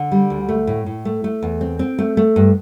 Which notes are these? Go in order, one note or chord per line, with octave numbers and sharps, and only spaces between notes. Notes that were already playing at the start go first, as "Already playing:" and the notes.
Already playing: D3
G3
D2
A3
A2
A2
A3
A3
E2
C4
C4
A3
A3
G2